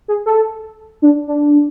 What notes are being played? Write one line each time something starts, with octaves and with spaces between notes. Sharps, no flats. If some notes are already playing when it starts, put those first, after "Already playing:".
G#4
A4
D4
D4